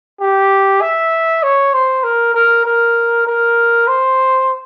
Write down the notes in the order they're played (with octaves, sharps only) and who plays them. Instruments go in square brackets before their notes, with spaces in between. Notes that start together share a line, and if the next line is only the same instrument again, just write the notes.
[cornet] G4
E5
C#5
C5
A#4
A#4
A#4
A#4
C5